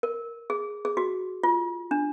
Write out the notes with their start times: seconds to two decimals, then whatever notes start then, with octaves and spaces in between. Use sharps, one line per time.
0.03 A#4
0.50 G#4
0.85 G#4
0.97 F#4
1.43 F4
1.91 D4